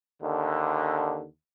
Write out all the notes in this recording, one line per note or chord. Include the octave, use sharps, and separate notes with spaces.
D#2 D3